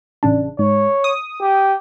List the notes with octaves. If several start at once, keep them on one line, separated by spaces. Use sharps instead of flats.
A1 C#3 D4
G#2 C#5
D#6
G4